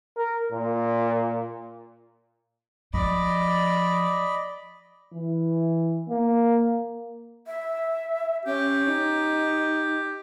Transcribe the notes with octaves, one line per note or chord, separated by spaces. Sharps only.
A#4
A#2
F3 D5 D#5 B5
E3
A#3
E5
C#4 G4
D#4